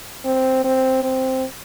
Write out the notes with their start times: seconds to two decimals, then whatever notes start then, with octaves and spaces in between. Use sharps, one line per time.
0.25 C4
0.64 C4
1.03 C4